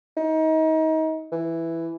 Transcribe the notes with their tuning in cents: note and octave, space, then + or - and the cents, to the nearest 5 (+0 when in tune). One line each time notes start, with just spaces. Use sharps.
D#4 +30
E3 +5